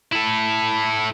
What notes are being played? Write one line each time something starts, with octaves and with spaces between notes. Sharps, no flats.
E4 A4